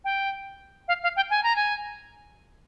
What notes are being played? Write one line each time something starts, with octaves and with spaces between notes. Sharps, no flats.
G5
F5
F5
G5
G#5
A#5
G#5